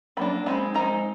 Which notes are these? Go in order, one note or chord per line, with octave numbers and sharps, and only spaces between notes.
F#3 A#3 D4 B5
G#3 C4 D#4 B5
G#3 C4 D#4 A#5